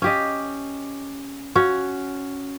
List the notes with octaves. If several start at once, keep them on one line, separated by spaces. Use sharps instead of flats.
C#4 G4 D#5
C#4 F#4